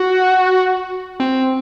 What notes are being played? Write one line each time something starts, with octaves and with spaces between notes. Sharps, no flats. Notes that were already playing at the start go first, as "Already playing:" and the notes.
Already playing: F#4
C4